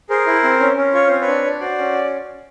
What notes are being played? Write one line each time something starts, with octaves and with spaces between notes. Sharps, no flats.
G#4 A#4 C5
E4
C4
C#4
C#4
F4 C#5
C4 C5
B4 C#5
D4
D4
F#4 C5 D5
C#4